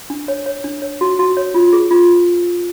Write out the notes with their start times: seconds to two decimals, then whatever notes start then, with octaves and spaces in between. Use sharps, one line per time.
0.10 D4
0.28 C#5
0.46 C#5
0.64 D4
0.82 C#5
1.01 F#4
1.19 F#4
1.37 C#5
1.54 F4
1.73 G#4
1.91 F4